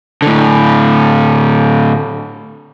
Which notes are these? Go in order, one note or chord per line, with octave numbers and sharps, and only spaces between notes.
A2 D3